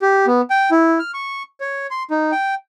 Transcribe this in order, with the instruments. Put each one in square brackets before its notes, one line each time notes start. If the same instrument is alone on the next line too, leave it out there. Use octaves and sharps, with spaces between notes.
[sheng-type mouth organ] G4
B3
G5
E4
F6
C#6
C#5
C6
D#4
G5